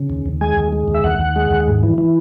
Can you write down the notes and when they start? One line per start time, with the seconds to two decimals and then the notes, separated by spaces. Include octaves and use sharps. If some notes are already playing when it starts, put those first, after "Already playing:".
Already playing: C#3
0.10 D#2
0.26 D#2
0.41 G#3 G#5
0.57 D#2
0.72 G#3
0.88 D#2
0.94 E5
1.04 D#2 F#5
1.19 D#2
1.36 G#3
1.51 D#2
1.67 G#2
1.83 E3
1.98 E3